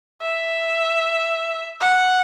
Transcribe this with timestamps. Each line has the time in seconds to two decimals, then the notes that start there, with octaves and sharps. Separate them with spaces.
0.21 E5
1.81 F#5